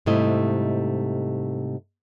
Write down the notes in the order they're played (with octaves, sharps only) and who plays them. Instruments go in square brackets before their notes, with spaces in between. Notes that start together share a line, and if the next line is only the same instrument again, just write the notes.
[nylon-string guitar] G#2 C3 G3 A3 E4 D#5